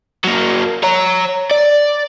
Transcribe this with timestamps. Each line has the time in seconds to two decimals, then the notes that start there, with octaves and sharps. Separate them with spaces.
0.24 F#3 A#3
0.83 C#5 A#5
1.51 D5